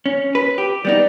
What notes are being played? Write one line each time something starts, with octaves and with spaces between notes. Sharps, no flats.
C#4
B4
G4
G3 B3 D#4 D5